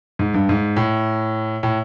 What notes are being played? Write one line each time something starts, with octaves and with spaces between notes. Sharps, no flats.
G#2
G2
G#2
A2
A2